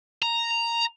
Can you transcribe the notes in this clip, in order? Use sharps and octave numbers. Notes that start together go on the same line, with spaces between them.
A#5